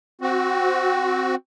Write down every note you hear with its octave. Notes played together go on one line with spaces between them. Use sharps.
C4 F#4